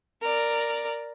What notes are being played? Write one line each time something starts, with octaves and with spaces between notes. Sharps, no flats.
A#4 D5